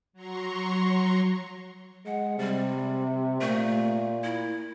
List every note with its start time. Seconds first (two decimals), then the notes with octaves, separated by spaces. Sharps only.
0.13 F#3 A#5 C6 C#6
2.06 G#3 F#5
2.39 C3 G3
3.41 A#2 A3
4.24 E4